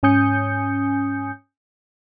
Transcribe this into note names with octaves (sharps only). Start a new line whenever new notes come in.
G#2 C#4 G#5 D#6 G6 C#7